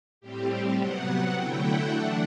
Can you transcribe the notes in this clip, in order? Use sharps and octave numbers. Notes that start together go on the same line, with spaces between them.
A2 G3 C4 G4
G4
C3 F#3 B3 F#5
D3 F#3 A3 E4 G5
F#5
E3 A3 D4 F#5